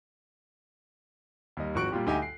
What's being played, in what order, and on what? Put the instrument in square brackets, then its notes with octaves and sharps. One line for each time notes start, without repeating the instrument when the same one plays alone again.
[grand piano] D#2 G3 D#5
G#1 F3 F#4 C#6 F#6 D7
A#2 G3 F4 G4
D2 D#4 G4 G5 G#5
C7